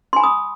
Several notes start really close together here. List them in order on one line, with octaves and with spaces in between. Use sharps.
C6 G#5 B5 D#6